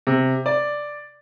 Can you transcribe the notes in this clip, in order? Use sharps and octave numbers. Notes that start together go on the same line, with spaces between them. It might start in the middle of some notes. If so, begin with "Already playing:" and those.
C3
D5